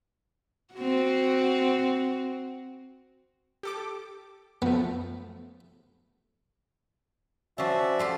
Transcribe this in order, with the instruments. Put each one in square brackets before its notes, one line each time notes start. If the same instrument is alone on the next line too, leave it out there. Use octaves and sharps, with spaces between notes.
[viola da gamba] C4 F#4
[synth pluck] G4 A4 D6
[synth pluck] F#2 F3 A3 [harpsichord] B3
[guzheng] F3 C#4 [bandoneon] F#4 D5 E5
[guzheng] A3 F4 G4